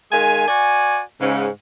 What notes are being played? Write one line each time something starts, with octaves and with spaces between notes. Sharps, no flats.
D#3 G#3 F5 G#5
F#4 D5 G#5
G#2 C#3